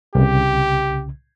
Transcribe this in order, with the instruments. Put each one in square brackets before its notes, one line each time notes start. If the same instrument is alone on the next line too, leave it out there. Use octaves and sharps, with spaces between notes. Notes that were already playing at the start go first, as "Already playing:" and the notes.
[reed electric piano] C2 C#3 [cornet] G4